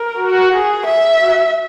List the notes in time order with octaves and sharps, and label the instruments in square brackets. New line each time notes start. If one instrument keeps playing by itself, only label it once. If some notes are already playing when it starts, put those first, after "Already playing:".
Already playing: [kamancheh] A#4
[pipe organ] F#4
[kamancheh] G#4
E5
[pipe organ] F#4